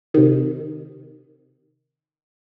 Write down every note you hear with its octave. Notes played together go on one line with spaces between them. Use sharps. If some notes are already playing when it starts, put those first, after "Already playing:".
C3 D#3